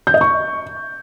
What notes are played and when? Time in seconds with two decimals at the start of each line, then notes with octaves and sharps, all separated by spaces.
0.07 G6
0.14 D#5
0.21 C#6